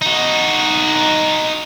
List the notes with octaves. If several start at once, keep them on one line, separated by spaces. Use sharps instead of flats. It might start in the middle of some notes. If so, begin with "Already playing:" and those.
D#4 F#4